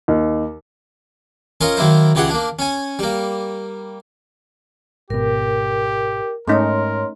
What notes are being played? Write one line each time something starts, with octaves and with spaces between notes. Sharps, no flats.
D#2
C#4 F4 A#4 D#5 A#5
D#3 F#3 A#3 E4 C5
C#2 E3 G4 G#4 F#5
A#3 D4
C#4 G#5
G3 A#3
G#1 B2 G4 A#4
G#2 A3 C#4 D#4 A#4 C#5 C6